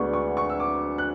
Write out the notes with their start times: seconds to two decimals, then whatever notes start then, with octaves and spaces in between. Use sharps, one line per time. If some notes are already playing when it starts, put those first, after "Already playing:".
Already playing: D2 D3 G#3 B3 D4 C#6
0.13 C#6
0.37 C#6
0.50 E6
0.60 D6
0.98 F#6